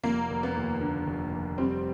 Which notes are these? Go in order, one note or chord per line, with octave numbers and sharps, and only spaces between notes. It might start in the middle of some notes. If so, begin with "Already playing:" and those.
F1 A#3
F1
B3
D#2
D3
F1
F1
G3 C4